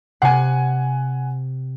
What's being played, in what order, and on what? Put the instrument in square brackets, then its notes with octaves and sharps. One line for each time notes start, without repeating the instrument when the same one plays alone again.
[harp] C3 C7 [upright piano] F#5 G#5